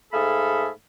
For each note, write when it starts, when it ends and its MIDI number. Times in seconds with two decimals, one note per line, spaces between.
0.13 0.68 44
0.13 0.68 57
0.13 0.68 68
0.13 0.68 69
0.13 0.68 77
0.13 0.68 83